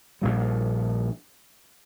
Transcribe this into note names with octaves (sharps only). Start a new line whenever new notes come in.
A#1 A#2 G3